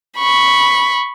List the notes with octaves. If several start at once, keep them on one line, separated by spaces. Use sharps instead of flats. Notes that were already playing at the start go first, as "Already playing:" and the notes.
B5 C#6